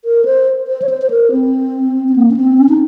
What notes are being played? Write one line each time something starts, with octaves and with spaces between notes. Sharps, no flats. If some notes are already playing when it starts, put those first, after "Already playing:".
A#4
C5
C5
C#5
C5
C5
A#4
C4
C4
A#3
C#4
C4
C#4
D#4